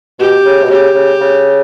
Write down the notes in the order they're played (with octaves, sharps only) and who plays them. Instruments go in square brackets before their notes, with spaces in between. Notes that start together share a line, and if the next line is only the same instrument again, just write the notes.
[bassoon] B2 [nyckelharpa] G4
[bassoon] C#3
B2
[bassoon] C#3 [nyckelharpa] G4
[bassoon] C#3
C#3